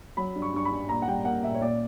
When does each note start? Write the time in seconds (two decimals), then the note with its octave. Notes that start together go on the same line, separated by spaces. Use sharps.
0.17 F#3 B5
0.35 G2
0.42 C#6
0.54 G2 C#6
0.65 B5
0.71 G2
0.89 A#2 A#5
1.02 F#5
1.08 G3 G5
1.25 A#3 F#5
1.43 A#2 E5
1.55 C#5
1.61 A#2 D5